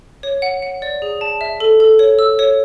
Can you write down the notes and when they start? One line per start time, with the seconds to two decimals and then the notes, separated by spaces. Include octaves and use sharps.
0.23 C#5
0.42 F#5
0.62 F#5
0.82 D5
1.02 G#4
1.21 A5
1.41 E5
1.60 A4
1.80 A4
1.99 C#5
2.19 E6
2.39 C#5